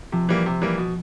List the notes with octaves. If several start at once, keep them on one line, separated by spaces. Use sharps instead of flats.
C3 F3
E3 G3 A#3
C3
E3 G3 A#3
B2